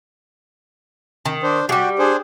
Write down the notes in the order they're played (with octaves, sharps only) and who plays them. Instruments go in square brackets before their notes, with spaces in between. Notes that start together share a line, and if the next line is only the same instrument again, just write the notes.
[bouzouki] D#3
[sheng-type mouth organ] D4 C5
[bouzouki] G3 G#3 [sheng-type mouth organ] F#4 G4
[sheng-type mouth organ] D4 G#4 C5